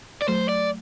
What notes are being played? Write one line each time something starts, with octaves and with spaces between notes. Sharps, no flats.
D5
F#3 A3 C5
D5